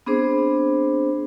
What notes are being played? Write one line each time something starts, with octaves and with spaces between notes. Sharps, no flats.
B3 C4 D4 G#4 C5